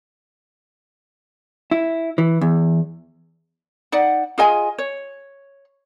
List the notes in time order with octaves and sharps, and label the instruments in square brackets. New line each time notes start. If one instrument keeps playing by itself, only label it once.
[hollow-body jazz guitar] E4
E3
E2
[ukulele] D#4 D5 F#5
F4 G#4 D#5 G#5
C#5